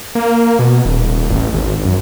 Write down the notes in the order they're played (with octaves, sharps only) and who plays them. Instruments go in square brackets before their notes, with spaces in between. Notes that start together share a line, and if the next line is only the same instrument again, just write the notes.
[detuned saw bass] A#3
B2
D#1
A1
G#1
F#2